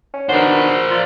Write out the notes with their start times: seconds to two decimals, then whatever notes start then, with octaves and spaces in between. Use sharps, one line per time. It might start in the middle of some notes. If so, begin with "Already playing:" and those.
0.14 C#4
0.29 D#3 B3 D4 F#4 A#4 C5
0.91 F4 D5